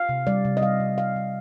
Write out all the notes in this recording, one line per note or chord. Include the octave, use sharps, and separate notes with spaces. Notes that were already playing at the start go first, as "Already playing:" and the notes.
Already playing: F5
C3
G3 D5
C3
D#5
G3 F5
C3
G3 F5
G3